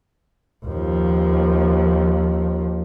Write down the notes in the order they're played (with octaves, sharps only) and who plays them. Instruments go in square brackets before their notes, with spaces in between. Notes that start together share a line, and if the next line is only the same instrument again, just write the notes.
[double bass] D#2 F3